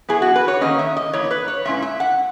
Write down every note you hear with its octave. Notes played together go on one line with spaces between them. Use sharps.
F#3 B3 E4 G#4
F#4
B4
C#5
D#3 A#3 C#4 D#5
E5
D#5
E3 A#3 E4 C#5
B4
C#5
A#2 G#3 C#4 E4 E5
E5
F#5